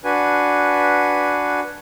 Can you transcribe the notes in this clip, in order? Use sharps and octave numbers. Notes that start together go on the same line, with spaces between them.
D4 F#4 B4 G#5